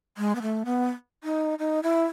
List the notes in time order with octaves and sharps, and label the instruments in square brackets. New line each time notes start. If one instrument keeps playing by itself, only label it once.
[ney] G#3
B3
A3
B3
D#4
D#4
E4